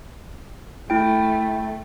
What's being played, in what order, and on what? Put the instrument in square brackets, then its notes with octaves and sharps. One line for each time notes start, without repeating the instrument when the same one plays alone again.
[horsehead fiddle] A3 [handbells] E4 G5